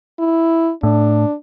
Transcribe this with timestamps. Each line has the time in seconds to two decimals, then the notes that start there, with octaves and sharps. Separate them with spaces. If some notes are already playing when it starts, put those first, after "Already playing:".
0.19 E4
0.83 A2 D4